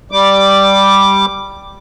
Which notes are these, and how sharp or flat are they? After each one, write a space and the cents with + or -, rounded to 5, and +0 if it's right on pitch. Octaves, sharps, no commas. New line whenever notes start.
G3 +0 D6 +0